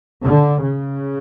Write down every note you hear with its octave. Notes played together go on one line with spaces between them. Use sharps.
D3
C#3